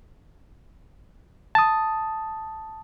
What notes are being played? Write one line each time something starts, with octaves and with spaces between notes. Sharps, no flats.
A5 D#6